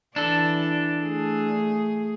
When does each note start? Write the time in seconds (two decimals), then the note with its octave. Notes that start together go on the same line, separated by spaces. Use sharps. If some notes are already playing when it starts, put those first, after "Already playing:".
0.16 E3 D4 A4 D5
1.01 A3 G#4